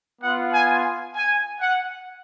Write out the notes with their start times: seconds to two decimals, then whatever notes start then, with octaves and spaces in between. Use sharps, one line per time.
0.22 B3 F4 F#5
0.53 G#5
1.15 G#5
1.60 F#5